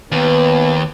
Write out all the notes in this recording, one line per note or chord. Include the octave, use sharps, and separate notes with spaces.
D#2 B3 B4